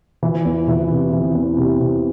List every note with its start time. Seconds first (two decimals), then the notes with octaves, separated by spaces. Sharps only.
0.23 E3
0.45 E2
0.68 E3
0.90 C3
1.13 E3
1.35 E2
1.57 C3
1.80 C3